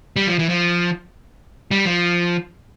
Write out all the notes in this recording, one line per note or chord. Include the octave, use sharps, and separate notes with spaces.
G3
F3
E3
F3
G3
F3